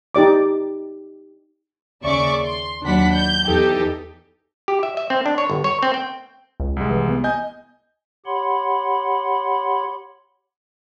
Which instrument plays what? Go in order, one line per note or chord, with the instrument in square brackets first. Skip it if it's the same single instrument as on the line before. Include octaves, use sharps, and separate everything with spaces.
[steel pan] D#4 G4 D5 D6
[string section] D#2 C#3 D5 E5 C#6 D6
C6
D#2 F#3 D4 F#5 B5 B6
G6
E2 E3 D#4 G4 A4
[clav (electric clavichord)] G4
E5
E5
C4
D4
C#5
G1
C#5
C4
G5
[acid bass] C#2
[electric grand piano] C2 G#3
[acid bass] E3
B3
[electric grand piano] D#5 G#5 G6
[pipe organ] G4 C#5 F#5 B5 C6